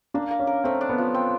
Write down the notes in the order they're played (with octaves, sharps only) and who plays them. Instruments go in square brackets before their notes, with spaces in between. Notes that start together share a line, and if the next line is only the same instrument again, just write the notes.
[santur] A#3 [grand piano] D4
[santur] A#3
[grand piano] C#4
[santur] A#4
[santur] A3 [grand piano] C4
[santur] D4
[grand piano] B3
[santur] F3
C4